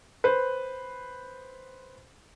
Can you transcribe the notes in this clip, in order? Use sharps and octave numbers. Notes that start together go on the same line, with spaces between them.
B4 C5